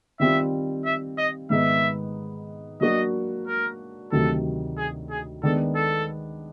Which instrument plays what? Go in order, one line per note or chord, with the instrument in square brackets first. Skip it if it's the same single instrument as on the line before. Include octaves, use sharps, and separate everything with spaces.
[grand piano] D#3 G3 C4 F4 [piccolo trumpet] E5
[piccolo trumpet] E5
D#5
[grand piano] G#2 D#3 G#3 B3 D#4 [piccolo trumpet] E5
[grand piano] F#3 A#3 D4 F#4 [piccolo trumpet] D#5
[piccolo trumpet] A#4
[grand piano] D2 C3 D#3 F#3 [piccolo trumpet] A4
[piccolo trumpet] G#4
G#4
[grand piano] D#3 G#3 B3 D4 [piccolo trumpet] A4
[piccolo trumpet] A4